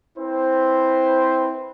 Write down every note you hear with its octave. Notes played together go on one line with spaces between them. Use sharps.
C4 E4 B4 C5